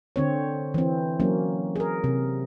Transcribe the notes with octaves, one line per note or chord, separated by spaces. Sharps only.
D3 C4 C#5
E3 C4
F#3 A#3 C#4
G#4 A#4
C3